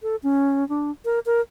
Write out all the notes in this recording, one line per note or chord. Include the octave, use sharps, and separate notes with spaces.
A4
C#4
D4
A#4
A#4